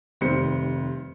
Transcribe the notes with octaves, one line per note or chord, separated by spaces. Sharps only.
F1 D#3 G3 C5 C#7